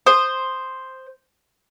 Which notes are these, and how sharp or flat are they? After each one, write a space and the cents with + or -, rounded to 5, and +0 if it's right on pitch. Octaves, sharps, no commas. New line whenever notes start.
C5 +0 D#6 -10